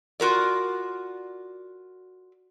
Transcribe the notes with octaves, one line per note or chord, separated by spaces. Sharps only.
F4 F#4 A#4 D5